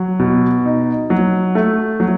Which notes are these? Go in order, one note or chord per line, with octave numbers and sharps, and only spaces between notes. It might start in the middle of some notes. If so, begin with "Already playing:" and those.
Already playing: F#3
B2
D#4
F#3
A3
F#3